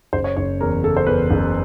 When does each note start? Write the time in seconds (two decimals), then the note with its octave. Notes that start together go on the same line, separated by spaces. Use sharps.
0.13 F#1 C5
0.24 C#5
0.36 F#1 C#5
0.60 E2 A#4
0.84 C#3 A4
0.97 C5
1.07 E2 B4
1.31 F#1